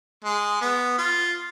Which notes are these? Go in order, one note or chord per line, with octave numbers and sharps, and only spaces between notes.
G#3
B3
F4